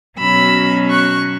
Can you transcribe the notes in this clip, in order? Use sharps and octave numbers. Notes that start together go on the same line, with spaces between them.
B2 F#3 C#4 B5 E6
C#6 F#6